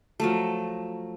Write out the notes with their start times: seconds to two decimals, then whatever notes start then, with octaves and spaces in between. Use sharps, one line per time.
0.20 F3 F#3 A3